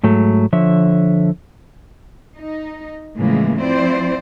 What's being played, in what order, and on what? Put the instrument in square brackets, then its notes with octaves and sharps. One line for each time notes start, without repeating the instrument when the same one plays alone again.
[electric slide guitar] G#2 F#3 A3
D3 F3 C#5 E5
[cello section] D#4
A2 C#3 E3 F3 G#3 A#3
F3 C4 E4 C5 D5